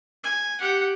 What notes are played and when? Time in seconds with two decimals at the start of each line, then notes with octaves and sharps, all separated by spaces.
0.24 G#5
0.60 G4 F#5